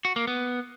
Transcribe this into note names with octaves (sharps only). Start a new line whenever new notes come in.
F#4
A#3
B3